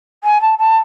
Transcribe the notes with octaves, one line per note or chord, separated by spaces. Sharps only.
G#5
A5
A5